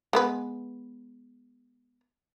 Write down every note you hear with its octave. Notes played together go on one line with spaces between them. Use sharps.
G#3 B3 B4